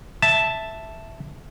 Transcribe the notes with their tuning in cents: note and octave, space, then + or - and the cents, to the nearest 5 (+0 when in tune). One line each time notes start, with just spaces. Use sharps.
E5 +0 A5 +0